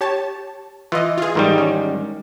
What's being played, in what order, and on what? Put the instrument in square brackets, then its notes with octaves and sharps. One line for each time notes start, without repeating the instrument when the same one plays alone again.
[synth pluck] G4 C#5 A5
[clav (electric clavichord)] E3 [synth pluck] F4 D#5
[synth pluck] F4 G#4
[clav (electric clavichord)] G#2 D#3 G3 [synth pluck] E3
[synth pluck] C#4